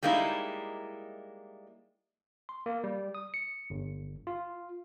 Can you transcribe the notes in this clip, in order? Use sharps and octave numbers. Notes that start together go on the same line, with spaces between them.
G3 G#3 A#3 D#4 E4
C6
A#3
G3
D#6
C#7
G1
F4